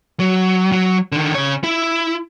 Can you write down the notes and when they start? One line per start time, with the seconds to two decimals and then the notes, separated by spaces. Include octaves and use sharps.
0.20 F#3
0.72 F#3
1.12 D3 D#3
1.35 C#3 C#5
1.64 E4